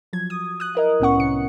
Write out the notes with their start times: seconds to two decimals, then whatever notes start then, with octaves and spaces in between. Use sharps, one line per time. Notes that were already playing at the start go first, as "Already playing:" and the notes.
0.13 F3 F#3 G#6
0.30 D#6
0.60 D#6 F#6
0.75 E4 A#4 D#5
1.00 C2 A2 B3 C#4 F#5 C#6
1.18 C2 C3 C#7